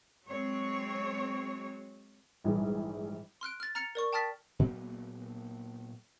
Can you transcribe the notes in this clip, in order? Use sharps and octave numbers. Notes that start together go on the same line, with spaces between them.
F#3 G#3 C4 C#5
A#1 G#2 E3 G3 G#4
C6 F6 F#6 D7
F6 A6
A#5 F6 A6 C#7 F7
A#4 D5 C#6
G5 A5 D#6 F6 A6 B6
A#2 F#3 A#3 B3